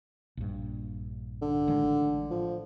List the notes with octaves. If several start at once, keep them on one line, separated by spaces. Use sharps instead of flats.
A#1 G2
D3
A1 D#3 G#3
F3